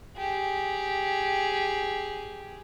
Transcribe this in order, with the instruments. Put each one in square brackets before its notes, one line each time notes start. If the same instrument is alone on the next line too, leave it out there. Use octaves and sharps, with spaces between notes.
[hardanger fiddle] G4 G#4